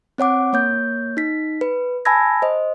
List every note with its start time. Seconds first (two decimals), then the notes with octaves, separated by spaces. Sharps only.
0.18 C4 C#5 F#5 D6
0.53 A#3 C#5 G6
1.17 D#4 B6
1.61 B4
2.05 G#5 A5 B5 E6 G#6 A#6
2.42 C5 D#5